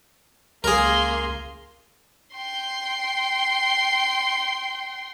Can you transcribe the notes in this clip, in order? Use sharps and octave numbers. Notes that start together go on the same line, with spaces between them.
C#2 A#3 G#4 A#4 C6
G5 C6